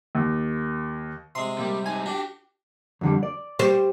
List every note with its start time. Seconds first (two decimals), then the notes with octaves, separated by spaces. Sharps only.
0.15 D#2
1.35 C3 G#3 C6
1.58 A#2 G3
1.86 G2 D#4 G#5
2.06 D4 F#4 G4
3.01 F2 D3 G3
3.23 D5
3.59 G3 C5